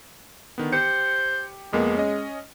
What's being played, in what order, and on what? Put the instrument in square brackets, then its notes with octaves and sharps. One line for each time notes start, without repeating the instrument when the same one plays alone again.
[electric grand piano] D3 D#3 B3
[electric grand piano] G4 C#7 [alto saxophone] C5
[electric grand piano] F2 A#3 B3 [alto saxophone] G#3
[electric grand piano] C#4 D#5